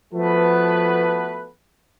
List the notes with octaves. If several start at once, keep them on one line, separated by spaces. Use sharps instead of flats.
F3 A3 B3 F#4 A4 B4